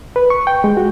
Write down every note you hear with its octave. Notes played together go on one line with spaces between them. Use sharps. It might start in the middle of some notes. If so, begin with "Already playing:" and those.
B4
C#6
G5
G#3
F#4